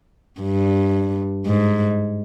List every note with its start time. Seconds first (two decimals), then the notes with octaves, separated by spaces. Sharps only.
0.41 G2
1.46 G#2